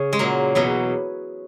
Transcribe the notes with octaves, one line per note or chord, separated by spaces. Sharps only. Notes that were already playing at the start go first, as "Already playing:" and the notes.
Already playing: C#3 C#4
G#3
A#2 F#3 A#3
E2 B2 F#3